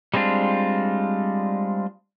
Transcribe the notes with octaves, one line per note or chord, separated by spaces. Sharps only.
G3 G#3 C4 D4 F4